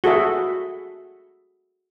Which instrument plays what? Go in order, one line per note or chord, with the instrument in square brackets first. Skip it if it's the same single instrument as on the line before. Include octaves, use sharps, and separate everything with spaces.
[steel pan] F#4 G#4 A4 E5